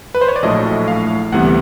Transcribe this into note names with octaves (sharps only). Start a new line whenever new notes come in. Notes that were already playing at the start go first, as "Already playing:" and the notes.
B4
C5
C#5
D5
A#1 A2 F#3 A3 D4 D#5
F5
D2 C3 E3 G3 B3 F#5